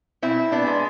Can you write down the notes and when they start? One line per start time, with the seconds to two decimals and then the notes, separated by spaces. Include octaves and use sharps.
0.22 B2 C4 E4
0.52 B3 D4
0.66 G#3